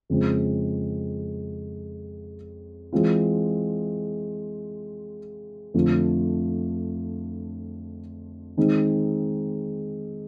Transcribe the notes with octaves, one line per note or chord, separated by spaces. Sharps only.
F2 C#3 F3 G#3 C4
E3 G#3 C4 F4
F2 D3 F3 A3
D#3 G#3 C4 D#4